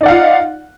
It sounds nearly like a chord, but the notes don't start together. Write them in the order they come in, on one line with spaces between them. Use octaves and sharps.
D#4 D5 F#5 F5 F4